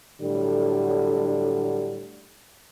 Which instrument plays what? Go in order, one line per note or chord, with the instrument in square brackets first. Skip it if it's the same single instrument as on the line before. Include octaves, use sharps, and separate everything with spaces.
[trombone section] A2 D3 F#3 G3